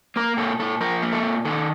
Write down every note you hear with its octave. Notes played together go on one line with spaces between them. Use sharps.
A#3 A#4
A#2 A4
A#2 A4
F3 A#4
A#3
A4
A#2
D#3 A4